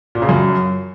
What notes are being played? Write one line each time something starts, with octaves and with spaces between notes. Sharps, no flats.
A#2
C#3
F#2